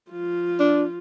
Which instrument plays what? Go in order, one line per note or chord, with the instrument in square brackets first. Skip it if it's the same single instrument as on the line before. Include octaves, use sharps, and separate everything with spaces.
[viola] F3 F4
[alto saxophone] D4